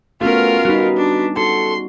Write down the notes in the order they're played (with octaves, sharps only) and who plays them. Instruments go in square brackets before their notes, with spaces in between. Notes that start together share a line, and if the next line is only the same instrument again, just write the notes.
[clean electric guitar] A3 [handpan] B3 C#4 F#4 [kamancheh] F4 A#4
[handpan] G3 D#4 [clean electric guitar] F#4 B4
[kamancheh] D4
[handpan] F#4 [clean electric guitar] A4 [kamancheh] C6